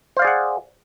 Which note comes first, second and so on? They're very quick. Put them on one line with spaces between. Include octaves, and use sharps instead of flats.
C5 F5 D5 G#4 F#5